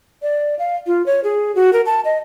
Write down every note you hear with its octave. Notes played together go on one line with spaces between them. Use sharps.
D5
F5
F4
C#5
G#4
F#4
A#4
A5
D#5